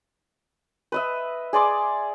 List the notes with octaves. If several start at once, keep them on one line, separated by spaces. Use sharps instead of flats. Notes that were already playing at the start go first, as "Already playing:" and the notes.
B4 D#5 E5
G#4 D5 C6 D6